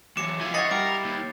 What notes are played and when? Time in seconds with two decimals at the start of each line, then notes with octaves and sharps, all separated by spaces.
0.17 E3 F#3 D6 C#7 E7
0.41 F2 E4 F5 G#5
0.54 B4 C#5 D#5 F#5 A6 C7 C#7
0.71 G3 A#4 D6 D7
1.04 D#2